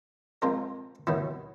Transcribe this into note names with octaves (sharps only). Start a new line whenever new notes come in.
F3 G#3 C4 F4 A#4
D#2 D#3 F#3 B3 E4